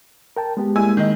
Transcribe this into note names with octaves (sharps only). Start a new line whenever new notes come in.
A#4 G5 A5
G#3 B3 G4
G3 G#3 A#3 E4 G#5 E6
D#3 D#4